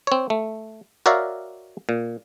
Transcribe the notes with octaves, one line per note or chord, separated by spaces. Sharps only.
C4 C#5
A3
F#4 A#4 C#5 D5 E5 F5
A#2